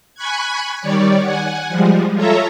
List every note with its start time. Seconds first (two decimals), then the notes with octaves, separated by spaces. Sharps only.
0.15 G#5 B5 C#6 F#6 G#6
0.81 D#3 G3 C#5 D5
1.22 F#5 G#5
1.69 F3 G3 G#3
2.15 F4 A4 C#5 E5 A#5